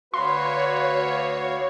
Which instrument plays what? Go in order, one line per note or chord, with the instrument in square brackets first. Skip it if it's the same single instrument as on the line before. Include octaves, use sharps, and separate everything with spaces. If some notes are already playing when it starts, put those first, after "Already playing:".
[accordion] D2 F#4 F5 [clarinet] B4 [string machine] C#5 [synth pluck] C6